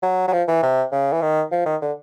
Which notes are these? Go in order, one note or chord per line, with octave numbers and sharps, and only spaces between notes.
F#3
F#3
F3
E3
C3
C#3
E3
D#3
F3
D#3
D3